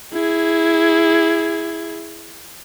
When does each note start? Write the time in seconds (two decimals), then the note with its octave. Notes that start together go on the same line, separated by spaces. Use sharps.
0.13 E4 G#4